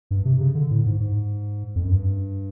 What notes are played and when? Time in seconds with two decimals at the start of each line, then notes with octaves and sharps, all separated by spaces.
0.11 G2
0.25 C3
0.40 C#3
0.55 D3
0.71 A2
0.86 G#2
1.00 G#2
1.76 F2
1.84 F#2
1.91 G2